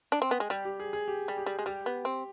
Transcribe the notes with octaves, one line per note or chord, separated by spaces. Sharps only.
D4
C4
B3
G#3
G3 G4
G4
G#4
G#4
G4
G3
G4
G3
G#3
G3 G4
B3
C4